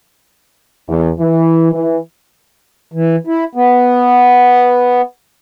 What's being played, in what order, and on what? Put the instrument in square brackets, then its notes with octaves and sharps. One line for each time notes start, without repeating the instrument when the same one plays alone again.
[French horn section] E2
E3
E3
[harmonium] E3
E4
B3